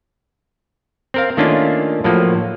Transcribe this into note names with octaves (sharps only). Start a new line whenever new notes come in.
C4 A#4 F5
D#3 A3 A#3 C#4 D4 F4
A2 F3 F#3 A#3